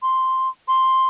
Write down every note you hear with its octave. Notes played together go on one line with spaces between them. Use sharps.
C6
C6